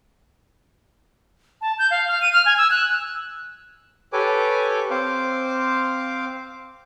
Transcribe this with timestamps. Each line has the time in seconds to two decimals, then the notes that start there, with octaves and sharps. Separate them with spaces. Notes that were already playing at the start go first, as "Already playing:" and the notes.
1.61 A5
1.79 G6
1.91 F5
2.08 F6
2.22 D#7
2.33 F6
2.46 G#5
2.58 E6
2.71 F#6
4.13 G4 A4 B4 C#5 G#5 D6
4.90 C4 C5 F5 D6